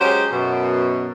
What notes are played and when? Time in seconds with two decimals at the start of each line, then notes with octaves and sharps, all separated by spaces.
0.01 F#3 G#3 C#4 G4 C5
0.32 F#2 B2